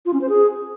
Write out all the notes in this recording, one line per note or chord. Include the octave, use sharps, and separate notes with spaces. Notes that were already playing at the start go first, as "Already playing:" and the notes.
F4
C#4
C5
G#4